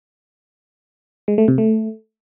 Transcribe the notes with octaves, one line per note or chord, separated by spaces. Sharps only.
G#3
A3
C3
A3